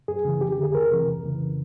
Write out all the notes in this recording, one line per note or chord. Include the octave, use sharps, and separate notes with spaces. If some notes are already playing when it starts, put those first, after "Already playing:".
F#2 G#4
C#3 E3
F2 G4
G4
D3
G#4
C#2 A#4
C3 E3
F2
C#3 E3